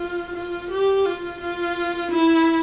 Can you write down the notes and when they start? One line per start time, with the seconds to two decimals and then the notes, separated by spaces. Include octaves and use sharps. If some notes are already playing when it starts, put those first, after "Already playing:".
Already playing: F4
0.36 F4
0.71 G4
1.05 F4
1.40 F4
2.11 E4